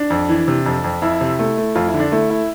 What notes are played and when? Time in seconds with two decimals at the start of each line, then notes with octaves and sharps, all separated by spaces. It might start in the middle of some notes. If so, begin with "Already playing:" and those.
Already playing: D4
0.10 F2
0.29 E3
0.48 C3
0.66 F2
0.84 F2
1.02 F2 E4
1.21 C3
1.39 A3 E4
1.57 A3
1.75 F2 F4
1.87 E4
1.94 D3
2.00 D4
2.12 A3 E4
2.30 E4